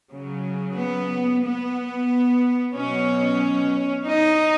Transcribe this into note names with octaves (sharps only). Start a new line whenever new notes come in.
C#3 F#3
B3
B3
B2 F#3 C#4
D#4